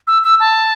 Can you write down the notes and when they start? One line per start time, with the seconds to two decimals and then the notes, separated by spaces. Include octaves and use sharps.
0.07 E6
0.24 E6
0.40 A5